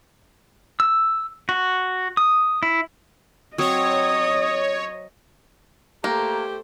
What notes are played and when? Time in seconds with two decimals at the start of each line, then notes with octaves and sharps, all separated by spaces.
0.80 E6
1.49 F#4
2.17 D#6
2.63 E4
3.58 F#3 C4 C#5 D#5 D#6
6.04 A3 A#3 G4 C5 A#5